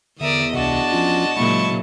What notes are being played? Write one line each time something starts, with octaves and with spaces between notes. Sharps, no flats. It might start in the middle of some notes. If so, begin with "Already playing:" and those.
E2 D3 A#4 D5 E5 D#6
C#2 C3 D4 F#4 D#5 A5
F3 C#4 F4
A#2 C#3 F#3 G#3 E4 C#6